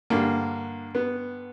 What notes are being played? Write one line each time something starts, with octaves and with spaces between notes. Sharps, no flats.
G2 D3 A#3
B3